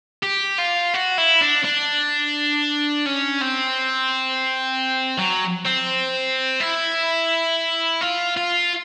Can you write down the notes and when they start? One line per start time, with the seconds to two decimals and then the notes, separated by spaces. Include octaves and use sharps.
0.23 G4
0.59 F4
0.94 F#4
1.18 E4
1.41 D4
1.64 D4
3.06 C#4
3.41 C4
5.18 F#3
5.65 C4
6.60 E4
8.01 F4
8.37 F4